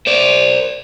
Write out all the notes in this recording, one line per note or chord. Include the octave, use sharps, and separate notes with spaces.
C5 D5